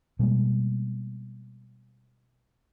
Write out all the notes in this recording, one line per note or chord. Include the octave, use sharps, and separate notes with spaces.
B2 G3 G#3 A#3